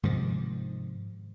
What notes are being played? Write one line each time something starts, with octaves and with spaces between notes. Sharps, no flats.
G#2 C3 D#3 F3